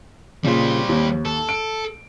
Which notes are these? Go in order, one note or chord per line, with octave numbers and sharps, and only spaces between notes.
A#2 C#3 G3 C5
D#2
A4
D7